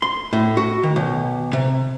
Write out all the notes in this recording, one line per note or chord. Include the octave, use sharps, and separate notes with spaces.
C6
A2
F#4
D#3
B1
C3